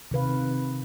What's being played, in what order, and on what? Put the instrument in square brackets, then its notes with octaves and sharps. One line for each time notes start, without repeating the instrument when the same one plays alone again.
[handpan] C3 D#3 B4 F5